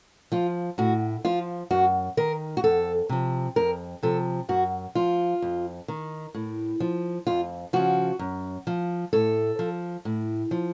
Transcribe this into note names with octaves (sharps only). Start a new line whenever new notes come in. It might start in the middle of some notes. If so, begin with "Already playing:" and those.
F3 F4
A2 F#4
F3 F4
F#2 F#4
D#3 A#4
F#4
F2 A4
C3 F3
F2 A#4
C3 F3 A4
F#2 F#4
F3 F4
F2
D#3
A2
F3
F2 F4
C#3 F3 F#4
F#2
F3
A2 A4
F3
A2
F3